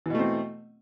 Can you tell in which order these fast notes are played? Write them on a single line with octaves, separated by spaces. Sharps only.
E3 B2 A3 C4